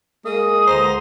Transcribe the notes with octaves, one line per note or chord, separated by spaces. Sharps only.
G#3 A#3 D#6
C#2 D3 C5 A#5